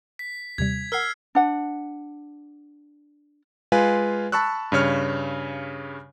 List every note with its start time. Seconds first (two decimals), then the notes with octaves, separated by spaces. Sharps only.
0.19 B6
0.58 D#2 C3 G3 G#6
0.92 A#4 F#5 E6 F6 C7
1.35 D4 F#5
3.72 G#3 F4 B4 F5 G#5
4.32 A5 B5 C#6 E6 F#6
4.72 G2 C#3 C#5 F6